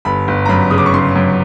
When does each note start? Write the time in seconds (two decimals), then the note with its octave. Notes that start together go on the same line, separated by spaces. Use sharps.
0.05 G1 B5
0.28 G1
0.46 A#5
0.49 F#2 B5
0.71 C#3 D#6
0.78 D6
0.86 C#6
0.94 C#3 C6
1.15 F#2